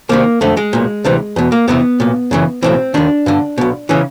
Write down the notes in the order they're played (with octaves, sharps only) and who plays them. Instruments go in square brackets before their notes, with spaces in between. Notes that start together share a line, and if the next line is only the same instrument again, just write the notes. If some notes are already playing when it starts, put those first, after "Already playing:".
[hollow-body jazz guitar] C2 C3 D#3 A#3
F2 D3 A3
G#3
B1 A#2
D2 C3 E3
E2 B2
A#3
E2 C3 E3 B3
B1 A#2
F#2 C#3 E3
B1 A2 E3 C4
D#2 D#3 D4
G2 D3
B1 B2
C#3 E3 C#4